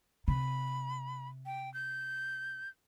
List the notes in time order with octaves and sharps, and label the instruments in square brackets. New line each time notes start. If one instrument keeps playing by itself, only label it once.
[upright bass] C3 [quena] B5
[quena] G5
G6